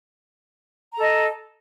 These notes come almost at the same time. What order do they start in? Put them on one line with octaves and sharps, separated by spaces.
A#5 A4 D#5